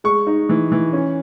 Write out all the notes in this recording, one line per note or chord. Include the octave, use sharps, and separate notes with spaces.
G#3 C#6
D#4
E3
E3
C#4